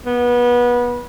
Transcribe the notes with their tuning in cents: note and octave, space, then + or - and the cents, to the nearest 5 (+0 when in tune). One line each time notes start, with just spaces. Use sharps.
B3 -25